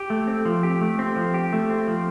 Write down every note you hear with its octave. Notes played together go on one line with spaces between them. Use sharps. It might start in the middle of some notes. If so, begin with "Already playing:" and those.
Already playing: G4
A3
C4
F3
G4
A3
C4
F3
G4
A3
C4
F3